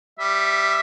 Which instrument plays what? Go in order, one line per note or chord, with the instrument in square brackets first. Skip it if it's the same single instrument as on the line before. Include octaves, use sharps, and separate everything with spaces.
[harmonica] G3 [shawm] E5